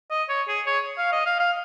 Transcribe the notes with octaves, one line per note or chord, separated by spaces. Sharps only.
D#5
C#5
G#4
C#5
F5
D#5
F5
F5